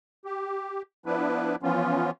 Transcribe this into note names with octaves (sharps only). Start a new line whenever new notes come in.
G4
F3 B3 D4 E4 B4
E3 F3 B3 C#4 F4